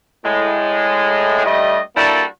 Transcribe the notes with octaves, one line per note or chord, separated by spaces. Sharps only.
A2 G#3
G2 G3 A3 D#5
G3 A#3 D4 E4 F#4 A4